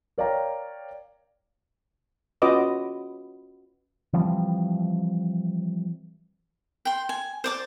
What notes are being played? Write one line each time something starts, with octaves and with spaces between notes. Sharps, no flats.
A#4 C#5 D5 F5 G5 A#5
C#4 F4 F#4 B4 D#5 D6
E3 F3 G3 C4
G5 C6
G#5
C5 D5 D6